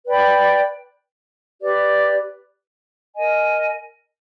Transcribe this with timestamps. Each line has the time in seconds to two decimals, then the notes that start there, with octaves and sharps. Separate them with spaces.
0.07 B4 D5 G5 B5
1.62 G4 B4 D5
3.16 A#4 D#5 G#5